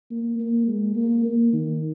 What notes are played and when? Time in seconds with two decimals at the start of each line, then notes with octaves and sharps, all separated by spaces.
0.11 A#3
0.39 A#3
0.68 G#3
0.96 A#3
1.25 A#3
1.53 D#3